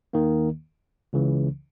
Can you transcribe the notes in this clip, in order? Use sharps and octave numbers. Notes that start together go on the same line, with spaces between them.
D#2 D#3 A#3
C#2 C#3 E3